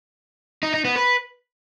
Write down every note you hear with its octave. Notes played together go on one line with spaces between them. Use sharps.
D#4
D#4
B3
B4